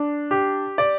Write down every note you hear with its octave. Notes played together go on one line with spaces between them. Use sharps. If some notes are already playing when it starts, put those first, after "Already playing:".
Already playing: D4
G4
D5